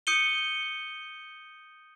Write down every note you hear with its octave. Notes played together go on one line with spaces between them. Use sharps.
D#6 G6 C#7 D#7 G7